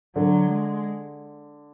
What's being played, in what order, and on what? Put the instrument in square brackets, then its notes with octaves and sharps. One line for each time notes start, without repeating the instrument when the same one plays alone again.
[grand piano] D3 [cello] F#3
[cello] G#3